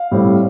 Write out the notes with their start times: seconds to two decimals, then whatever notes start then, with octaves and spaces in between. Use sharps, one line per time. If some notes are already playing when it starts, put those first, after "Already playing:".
Already playing: F5
0.11 A2 G3 C4